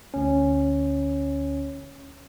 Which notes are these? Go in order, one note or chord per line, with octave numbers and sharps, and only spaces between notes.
D2 C#4